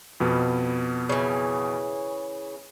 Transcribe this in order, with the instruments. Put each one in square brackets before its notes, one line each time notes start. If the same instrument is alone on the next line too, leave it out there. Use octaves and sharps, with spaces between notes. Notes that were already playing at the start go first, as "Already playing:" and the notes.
[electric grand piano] F2 B2 B3
[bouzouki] C#3 E3